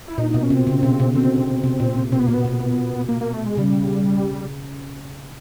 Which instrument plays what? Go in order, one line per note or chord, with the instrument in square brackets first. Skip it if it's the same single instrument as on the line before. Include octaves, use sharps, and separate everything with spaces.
[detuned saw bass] E4
[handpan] A#2 [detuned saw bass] D#4
[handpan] B2 [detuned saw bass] D#4
[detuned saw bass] C#4
[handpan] C3 [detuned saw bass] C4
[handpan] C#3
B2
B2
[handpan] D3 [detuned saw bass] C4
[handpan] C3
A#2
A#2
[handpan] B2 [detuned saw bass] C4
[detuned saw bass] B3
[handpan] A#2 [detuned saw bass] A#3
[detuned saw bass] B3
[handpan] B2
B2
[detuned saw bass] A#3
A#3
A3
G#3
[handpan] C#3 [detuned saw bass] G3